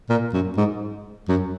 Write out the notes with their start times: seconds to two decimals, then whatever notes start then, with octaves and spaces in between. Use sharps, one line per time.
0.10 A#2
0.34 F#2
0.57 G#2
1.29 F#2